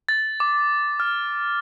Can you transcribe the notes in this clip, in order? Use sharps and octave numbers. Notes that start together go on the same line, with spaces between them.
A6
D6
F6